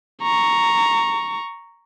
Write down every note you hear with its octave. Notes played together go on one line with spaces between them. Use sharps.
A#5 C#6